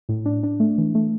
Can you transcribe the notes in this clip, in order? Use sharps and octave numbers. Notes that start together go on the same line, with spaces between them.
A2
D4
D4
A3
E3
A3